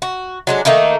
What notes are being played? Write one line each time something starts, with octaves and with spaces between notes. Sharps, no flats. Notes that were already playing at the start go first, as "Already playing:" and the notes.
F#4
F#3 G#3 D4
D#3 A3 A#3 D#4